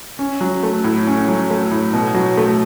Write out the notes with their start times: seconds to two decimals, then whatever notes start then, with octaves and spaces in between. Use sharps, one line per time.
0.19 C#4
0.41 F#3
0.63 A3
0.84 A2
1.07 C#4
1.28 F#3
1.50 A3
1.71 A2
1.93 B2
2.14 F#3
2.37 A3